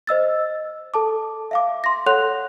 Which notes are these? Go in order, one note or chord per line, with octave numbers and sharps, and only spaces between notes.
C5 D#5 E6 A6
A4 A5 D6
E5 F5 D6
C6 A#6
A4 C#5 F#5 C6 F#6 F7